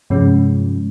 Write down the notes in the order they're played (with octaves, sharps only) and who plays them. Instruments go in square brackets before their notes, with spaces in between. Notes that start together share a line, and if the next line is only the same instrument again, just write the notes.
[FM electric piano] G2 C3 F3 G#3 C#4